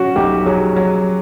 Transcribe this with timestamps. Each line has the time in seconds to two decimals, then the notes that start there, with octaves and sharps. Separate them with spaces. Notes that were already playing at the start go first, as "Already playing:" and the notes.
Already playing: C#4 F#4
0.16 B1 G4
0.46 F#3 G#4
0.76 F#3